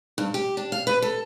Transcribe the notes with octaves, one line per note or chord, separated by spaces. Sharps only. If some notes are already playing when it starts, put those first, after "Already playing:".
G2
G4
D4
F5
B4
A4